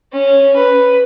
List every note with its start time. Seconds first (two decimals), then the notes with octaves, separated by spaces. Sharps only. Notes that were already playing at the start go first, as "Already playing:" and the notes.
0.13 C#4
0.56 B4